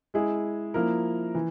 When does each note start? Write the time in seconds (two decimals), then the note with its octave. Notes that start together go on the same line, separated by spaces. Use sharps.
0.14 G#3 E4 G#4
0.74 F3 A#3 E4 A#4
1.35 E3